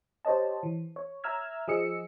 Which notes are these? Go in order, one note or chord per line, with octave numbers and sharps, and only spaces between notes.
G4 C5 C#5 D#5 A5
E3
C#5
E5 A#5 E6 F6 G#6
F3 G#4 D#5 E6 C#7